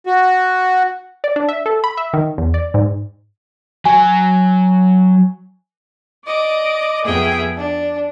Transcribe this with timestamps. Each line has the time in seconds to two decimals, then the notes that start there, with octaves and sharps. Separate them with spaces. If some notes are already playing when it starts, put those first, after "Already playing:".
0.06 F#4
1.24 D5
1.36 D4
1.49 E5
1.66 A4
1.84 B5
1.97 E5
2.13 D#3
2.38 E2
2.54 D5
2.74 G#2
3.85 F#3 G#5
6.25 D5 D#5 D6
7.04 F2 B3 G#4 E5 G5
7.57 D4